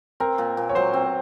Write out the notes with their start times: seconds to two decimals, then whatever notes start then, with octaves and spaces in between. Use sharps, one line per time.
0.20 C4 A#4
0.38 A#2
0.57 A#2
0.69 C#5
0.75 F#3 C5
0.93 C4